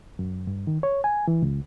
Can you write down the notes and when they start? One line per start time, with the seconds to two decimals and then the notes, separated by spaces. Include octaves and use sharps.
0.19 F#2
0.47 G2
0.67 D#3
0.83 C#5
1.04 G#5
1.28 E3
1.42 C#2